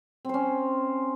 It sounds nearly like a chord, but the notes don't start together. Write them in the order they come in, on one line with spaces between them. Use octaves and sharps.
C4 C5 C#4